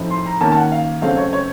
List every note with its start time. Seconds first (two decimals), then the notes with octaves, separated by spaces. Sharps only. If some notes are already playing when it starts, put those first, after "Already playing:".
Already playing: A2 F3 C4 D#4
0.10 C6
0.26 A#5
0.40 D#3 A#3 C#4 A5
0.52 A5
0.56 F#5
0.72 F5
1.02 C#3 F#3 A3 C4 F5
1.17 C#5
1.33 C#5